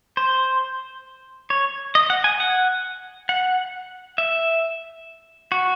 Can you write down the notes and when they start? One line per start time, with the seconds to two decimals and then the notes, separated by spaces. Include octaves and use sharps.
0.17 C5
1.50 C#5
1.95 D#5
2.10 F#5
2.24 G#5
2.40 F#5
3.29 F#5
4.18 E5
5.52 F#4